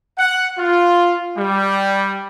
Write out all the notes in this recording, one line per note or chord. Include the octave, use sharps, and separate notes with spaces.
F#5
F4
G3